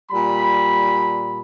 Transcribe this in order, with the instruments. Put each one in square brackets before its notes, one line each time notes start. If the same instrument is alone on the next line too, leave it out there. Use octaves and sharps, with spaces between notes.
[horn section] A#2 G3 B5